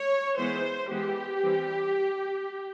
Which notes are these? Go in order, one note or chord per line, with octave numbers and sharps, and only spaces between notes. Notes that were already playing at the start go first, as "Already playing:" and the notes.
Already playing: C#5
E3 G#3 B3 C5
E3 G#3 B3 G4
E3 G3 C4